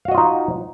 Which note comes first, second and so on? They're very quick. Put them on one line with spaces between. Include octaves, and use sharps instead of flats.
F5 F#4 D#5 F4 D#4